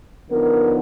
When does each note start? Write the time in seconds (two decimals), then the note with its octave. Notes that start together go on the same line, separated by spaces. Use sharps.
0.30 D3 F3 B3 D#4 A#4